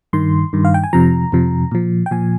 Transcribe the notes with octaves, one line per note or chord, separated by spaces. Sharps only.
G2 D#3 C6
G2 D#3
F5
G5
G#5
F2 C3 F3 A#5
F2 C3 F3
A#2 F3
G5
A#2 F3 G#5